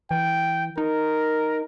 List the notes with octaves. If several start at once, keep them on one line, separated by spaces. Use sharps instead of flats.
E3 G5
D#4 A#4